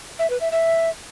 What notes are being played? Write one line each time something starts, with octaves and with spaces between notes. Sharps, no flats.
E5
B4
E5
E5